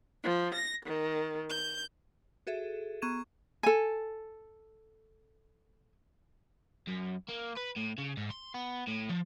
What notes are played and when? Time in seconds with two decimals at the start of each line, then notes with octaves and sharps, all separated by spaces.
0.23 F3
0.54 A#6
0.85 D#3
1.49 G6
2.47 F#4 G#4 A4 E5
3.02 B3 A#5 C#6 G#6 D#7 E7
3.63 A4 G#5
6.88 F#2
7.28 A#3
7.57 B4
7.76 A2
7.98 C#3
8.17 G#2
8.30 C6
8.54 B3
8.87 A2
9.09 F3